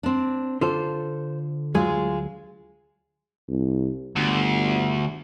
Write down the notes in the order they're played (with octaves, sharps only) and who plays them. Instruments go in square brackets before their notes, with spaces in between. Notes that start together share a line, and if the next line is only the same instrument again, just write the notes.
[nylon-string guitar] C4 D4
[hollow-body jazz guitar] D3 F4 A4 [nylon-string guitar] C5
[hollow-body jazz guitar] D2 F#3 G#4 [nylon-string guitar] G#3 F4
[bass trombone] C2
[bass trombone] G1 [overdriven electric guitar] D2